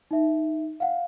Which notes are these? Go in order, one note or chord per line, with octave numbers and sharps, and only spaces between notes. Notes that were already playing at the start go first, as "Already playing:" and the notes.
D#4 E5
F5 F#5